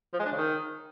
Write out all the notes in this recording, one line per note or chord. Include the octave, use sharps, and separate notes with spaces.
F3
G#3
D4
C#3
D#3